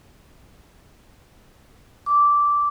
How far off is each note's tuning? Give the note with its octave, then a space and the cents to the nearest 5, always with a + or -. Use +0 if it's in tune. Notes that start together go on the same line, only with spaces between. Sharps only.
D6 -10